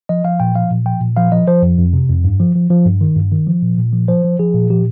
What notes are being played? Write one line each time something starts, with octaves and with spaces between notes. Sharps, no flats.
F3 D#5
F3 F5
A#2 G5
F3 F5
A#2
F3 G5
A#2
F3 F5
F3 D#5
F3 C5
F2
F2
C3
F2
G2
F3
F3
F3
G2
D#3
G2
D#3
F3
A#2
A#2
F3
F3 C5
F3
F3 G#4
A#2
F3 G4